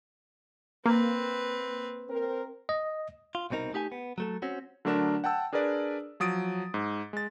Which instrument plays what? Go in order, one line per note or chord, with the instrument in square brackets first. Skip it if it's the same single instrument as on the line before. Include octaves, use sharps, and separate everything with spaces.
[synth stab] A#3 [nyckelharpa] C4 B4
[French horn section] C4 A#4
[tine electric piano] D#5
[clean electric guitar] F4
C2 B2 C4 D#4 A#4
A3 D#4 G4 F#5 G#5
B3
F#3 A3 A4
C4 C#4 F#4
[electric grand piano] D3 F#3 A3 D4 A#4 E7
F#5 G5 A5 E6
D4 G#4 A#4 B4 D5
F3 F#3 D#6 A6 D7
G#2
G#3 A6